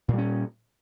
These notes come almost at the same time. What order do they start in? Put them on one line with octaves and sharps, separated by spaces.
A#2 G3 C#4